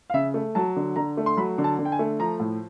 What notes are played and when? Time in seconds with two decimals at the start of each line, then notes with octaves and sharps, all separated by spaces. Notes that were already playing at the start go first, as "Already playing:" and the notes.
0.10 F5
0.14 C#3 E5
0.34 A3
0.55 F#3 A5
0.76 D3
0.96 D3 A#5
1.17 A3
1.26 C6
1.37 F#3 B5
1.58 D3
1.64 A5
1.79 D3
1.85 G5
1.92 G#5
1.99 A3
2.19 F3 A#5
2.40 A2